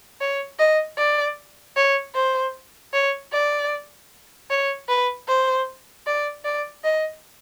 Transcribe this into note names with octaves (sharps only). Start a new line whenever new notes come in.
C#5
D#5
D5
C#5
C5
C#5
D5
C#5
B4
C5
D5
D5
D#5